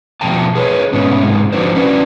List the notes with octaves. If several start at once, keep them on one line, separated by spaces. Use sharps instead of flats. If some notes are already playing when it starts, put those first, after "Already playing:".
B2 F3 A3 G5 A5
G#4 B4 C#5
G#2 B2 G#3 A3 B3 C#4
G#2 C3 E3 G#3
F3 D4 F#4 B4 C5
C#4 D4 E4 F#4 B4 D5